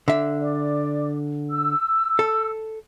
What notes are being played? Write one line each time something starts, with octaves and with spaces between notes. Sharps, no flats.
D3 E5
D5 D6
E6
A4